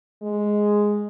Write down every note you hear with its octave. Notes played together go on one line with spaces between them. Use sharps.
G#3